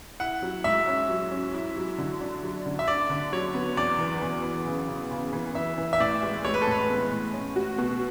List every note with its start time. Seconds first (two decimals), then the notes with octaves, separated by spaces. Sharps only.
0.20 E4 F#5
0.42 F#3
0.64 G#2 E5
0.87 C#4
1.09 F#3
1.31 C#4
1.54 E4
1.76 F#3
1.98 D3
2.21 D4
2.43 F#3
2.66 D3
2.79 E5
2.88 D4 D5
3.10 D3
3.32 F#3 C#5
3.54 B3
3.77 E2 D5
3.99 E3
4.22 E2
4.44 E2
4.66 C#3
4.88 C#3
5.11 C#3
5.33 E3
5.55 E3 E5
5.78 E3
5.93 E5
6.00 A2 D5
6.22 G#3
6.45 G#3 C#5
6.54 B4
6.62 A4
6.67 A2 B4
6.89 B3
7.11 A2
7.33 C#4
7.56 F#4
7.78 B2